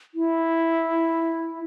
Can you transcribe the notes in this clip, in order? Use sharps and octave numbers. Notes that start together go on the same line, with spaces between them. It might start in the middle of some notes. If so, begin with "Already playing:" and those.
E4